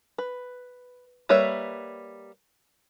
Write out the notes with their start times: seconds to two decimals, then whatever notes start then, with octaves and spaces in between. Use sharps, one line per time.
0.18 B4
1.29 G3 A#3 B4 C#5 E5